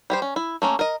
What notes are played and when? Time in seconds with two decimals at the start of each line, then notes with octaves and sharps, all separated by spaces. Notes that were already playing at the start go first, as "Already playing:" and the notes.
0.10 G3 G4 C5
0.22 C#4
0.36 E4
0.62 A3 A#3 C#4
0.79 A#4 D#5